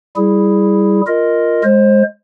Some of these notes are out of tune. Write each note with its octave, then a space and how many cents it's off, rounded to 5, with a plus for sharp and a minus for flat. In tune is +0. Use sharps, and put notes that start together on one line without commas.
G3 +0 E4 +0 G#4 +0
F4 +0 A#4 +0 D#5 +0
G#3 +0 C5 +25